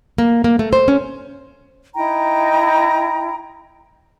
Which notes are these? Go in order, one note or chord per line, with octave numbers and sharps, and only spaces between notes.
A#3
A#3
A3
C5
C#4
D#4 E4 G5 A#5